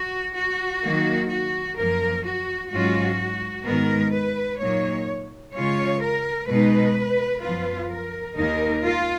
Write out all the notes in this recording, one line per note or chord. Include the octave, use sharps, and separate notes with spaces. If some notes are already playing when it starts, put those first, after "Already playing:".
Already playing: F#4
F#4
D#3 F#3 A#3
F#4
F#2 F3 A#3 A#4
F#4
G#2 F#3 C#4 F4 F#4
G#2 D#3 G#3 B3 A#4
B4
A#2 F#3 A#3 D#4 C#5
C#3 G#3 C#4 F4 C#5
A#4
B2 G#3 D#4 B4
F#2 F3 B3 F4 B4
A#4
D#2 D#3 A#3 D#4 A#4
F4